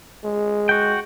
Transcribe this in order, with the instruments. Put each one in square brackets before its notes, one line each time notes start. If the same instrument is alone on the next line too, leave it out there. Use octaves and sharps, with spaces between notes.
[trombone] G#3
[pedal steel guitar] F#4 G5